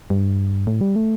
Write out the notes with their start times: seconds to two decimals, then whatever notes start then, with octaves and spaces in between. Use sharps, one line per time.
0.10 G2
0.67 A2
0.81 G3
0.96 A3